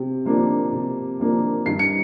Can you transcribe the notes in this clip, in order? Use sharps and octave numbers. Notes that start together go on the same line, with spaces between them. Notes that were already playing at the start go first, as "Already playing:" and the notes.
Already playing: C3
F3 A#3 D4
C3
F3 A#3 D4
G2 C7
C#7